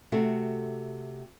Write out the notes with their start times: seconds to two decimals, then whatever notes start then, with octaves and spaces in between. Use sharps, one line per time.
0.12 C3 A3 F#4